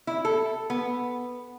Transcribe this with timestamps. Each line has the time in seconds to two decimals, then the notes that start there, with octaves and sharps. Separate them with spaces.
0.07 E4
0.25 A4
0.70 B3